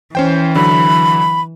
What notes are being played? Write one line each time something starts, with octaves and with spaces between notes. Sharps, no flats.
E3 C#4 C5 G5
D3 F#3 B5